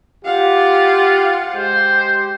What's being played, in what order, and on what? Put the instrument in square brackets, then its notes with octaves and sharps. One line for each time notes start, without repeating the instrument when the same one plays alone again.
[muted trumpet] F4 [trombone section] G4 [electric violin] F5 F#5
[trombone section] G#3 G4 [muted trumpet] C5